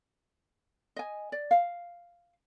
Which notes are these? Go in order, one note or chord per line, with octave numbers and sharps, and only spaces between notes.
D#5 G#5
D5
F5